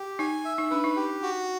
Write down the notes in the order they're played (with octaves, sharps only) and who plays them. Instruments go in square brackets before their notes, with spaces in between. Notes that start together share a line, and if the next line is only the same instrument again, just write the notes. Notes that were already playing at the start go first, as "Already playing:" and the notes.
Already playing: [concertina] G4
[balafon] D#4 [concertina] G#5
[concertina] E5
[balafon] D#4
[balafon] D4 [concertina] B4
[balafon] D#4
[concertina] G4
F#4